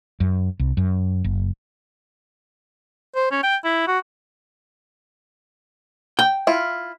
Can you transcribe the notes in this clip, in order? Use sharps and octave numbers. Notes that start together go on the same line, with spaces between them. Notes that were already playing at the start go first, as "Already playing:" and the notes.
F#2
C2
F#2
F#1
C5
C#4
G5
E4
F#4
G5
E4 F4